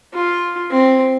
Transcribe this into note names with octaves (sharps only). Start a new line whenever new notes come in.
F4
C4